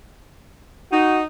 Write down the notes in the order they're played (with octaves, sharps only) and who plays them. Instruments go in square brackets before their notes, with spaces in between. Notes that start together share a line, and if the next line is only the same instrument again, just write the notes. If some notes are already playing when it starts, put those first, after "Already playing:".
[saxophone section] D#4 [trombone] F#4